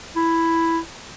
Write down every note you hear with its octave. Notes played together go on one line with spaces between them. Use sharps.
E4